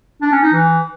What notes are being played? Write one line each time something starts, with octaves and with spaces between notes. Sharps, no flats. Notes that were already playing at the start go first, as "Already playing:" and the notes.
D4
C#4
D#4
E3